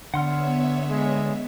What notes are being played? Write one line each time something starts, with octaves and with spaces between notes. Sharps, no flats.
D3 B3 C#5 E5 F#5 C6 F6
G#3